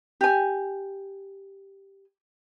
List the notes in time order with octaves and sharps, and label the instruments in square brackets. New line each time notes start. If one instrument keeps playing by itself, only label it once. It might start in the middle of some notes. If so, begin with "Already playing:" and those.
[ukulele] G4 G#5